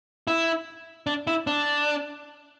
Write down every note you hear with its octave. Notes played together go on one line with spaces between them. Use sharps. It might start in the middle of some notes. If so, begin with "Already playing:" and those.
E4
D4
E4
D4